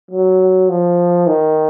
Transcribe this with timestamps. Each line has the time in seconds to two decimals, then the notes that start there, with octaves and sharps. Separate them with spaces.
0.11 F#3
0.69 F3
1.27 D#3